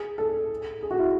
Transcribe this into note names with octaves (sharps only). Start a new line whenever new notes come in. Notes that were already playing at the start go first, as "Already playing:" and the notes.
Already playing: G#4
A4
G#4
F#4
E4